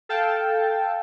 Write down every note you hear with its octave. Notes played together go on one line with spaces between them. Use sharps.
A4 F5 G5 A5